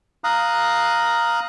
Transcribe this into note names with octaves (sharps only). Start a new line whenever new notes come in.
F5 A#5 D#6 F#6